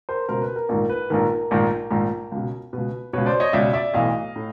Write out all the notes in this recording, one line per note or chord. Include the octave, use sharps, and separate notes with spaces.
A#4 C5
C#2 B2 A#4 C5
B4
A#4
A#1 G#2 D#3 A#4
B4
A#1 G#2 D#3 A#4
A#1 G#2 D#3
A#1 G#2 D#3
C#2 B2
C#2 B2 B4
C#2 B2 B4 C#5
C5 D5
C#5 D#5
C#2 B2 D5 E5
D5 E5
B1 A2 E3 D#5 F5
A2